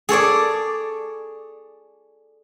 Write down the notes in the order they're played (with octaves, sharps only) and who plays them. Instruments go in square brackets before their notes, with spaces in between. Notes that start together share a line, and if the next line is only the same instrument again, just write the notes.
[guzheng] G#4 A4 C#5 D5